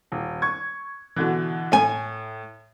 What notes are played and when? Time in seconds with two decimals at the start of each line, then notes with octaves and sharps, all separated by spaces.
0.12 D#1
0.42 C#6 G#6
1.16 B2 D3 E3
1.73 A2 G#5